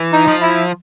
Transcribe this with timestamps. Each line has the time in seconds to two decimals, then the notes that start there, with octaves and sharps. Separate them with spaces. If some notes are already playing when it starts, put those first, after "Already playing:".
Already playing: E3
0.13 D#4
0.28 F3
0.42 E4